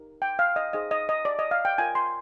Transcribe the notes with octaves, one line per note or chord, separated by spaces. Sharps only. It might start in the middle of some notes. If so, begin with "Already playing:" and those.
Already playing: D#4 G4 A#4
G5
F5
D#5
D#4 G#4 C5 D#5
D#5
D#5
D5
D#5
F5
G5
F4 A#4 G#5
C6